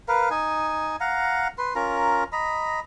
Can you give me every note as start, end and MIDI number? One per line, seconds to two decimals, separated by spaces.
0.08 0.29 70
0.08 0.29 71
0.08 0.29 77
0.30 0.96 63
0.30 0.96 80
1.01 1.48 77
1.01 1.48 78
1.01 1.48 82
1.58 1.73 71
1.58 1.73 84
1.75 2.24 61
1.75 2.24 65
1.75 2.24 70
1.75 2.24 82
2.32 2.80 75
2.32 2.80 82
2.32 2.80 83